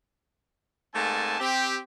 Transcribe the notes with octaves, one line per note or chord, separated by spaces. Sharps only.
G#2 A3 A#3 C4 G#5 A5
C4 G4